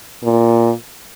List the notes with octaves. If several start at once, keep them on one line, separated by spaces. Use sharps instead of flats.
A#2